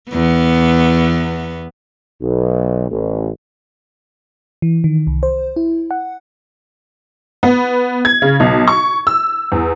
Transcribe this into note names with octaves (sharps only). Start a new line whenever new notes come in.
E2 B3
B1
A1
E3
D#3
C2
C5
E4
F#5
B3
G#6
C#3
B1
C#6
E6
E2